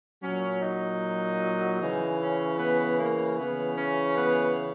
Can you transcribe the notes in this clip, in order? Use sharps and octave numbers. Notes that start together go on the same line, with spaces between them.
A#2 F#3 C#4
D#4
C#3 E3
C#4
B3
A#3
C#3 E3 B3
C#4
B3